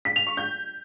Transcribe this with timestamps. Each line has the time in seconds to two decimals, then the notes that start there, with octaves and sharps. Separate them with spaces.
0.05 B6
0.16 F7
0.27 C#6
0.37 G6